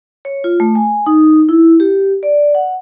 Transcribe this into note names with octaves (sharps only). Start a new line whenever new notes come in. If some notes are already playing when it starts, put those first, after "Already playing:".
C#5
F4
A3
G#5
D#4
E4
G4
D5
F#5